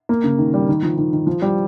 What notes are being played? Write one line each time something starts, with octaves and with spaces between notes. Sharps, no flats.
A#3
C#3
D#3
G3
D#3
F3
D#3
D#3
F3
G3